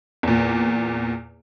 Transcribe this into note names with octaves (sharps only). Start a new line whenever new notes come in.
E2 A#2